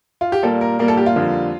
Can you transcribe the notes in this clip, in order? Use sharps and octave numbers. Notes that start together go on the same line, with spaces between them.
F4
G4
A#2 G3 A#3 A4
A#4
A#2 G3 A#3 A#4
A4
G4
F4
F2 D3 G3 A#3